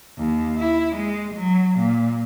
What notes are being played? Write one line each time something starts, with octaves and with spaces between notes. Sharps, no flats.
D#2
E4
G#3
F#3
A#2